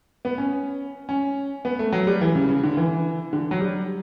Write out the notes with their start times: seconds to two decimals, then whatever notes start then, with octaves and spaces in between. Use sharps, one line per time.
0.25 B3
0.38 C#4
1.09 C#4
1.65 B3
1.79 A3
1.92 F#3
2.07 G3
2.21 E3
2.35 C#3
2.49 C#3
2.63 D3
2.77 E3
3.33 D3
3.51 F#3
3.60 G3